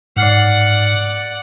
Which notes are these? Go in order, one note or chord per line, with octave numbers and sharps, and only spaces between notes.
G#2 D5 F#5 F6 C7